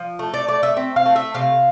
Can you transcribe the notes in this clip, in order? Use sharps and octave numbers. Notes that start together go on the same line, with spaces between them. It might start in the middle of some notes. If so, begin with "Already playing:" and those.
Already playing: F3
A3
D5
A3 D5
E5
C4 E5
F5
A3
E5
C3 F5